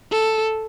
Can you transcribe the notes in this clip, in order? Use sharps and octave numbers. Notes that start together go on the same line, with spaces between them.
A4